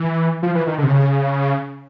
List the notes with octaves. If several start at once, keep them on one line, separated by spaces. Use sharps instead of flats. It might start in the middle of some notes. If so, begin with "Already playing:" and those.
Already playing: E3
F3
E3
D#3
D3
C3
C#3